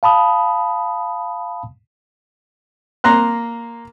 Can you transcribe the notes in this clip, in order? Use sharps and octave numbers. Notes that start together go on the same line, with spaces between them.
F5 A5 B5 D#6
A#3 A#5 C6 F#6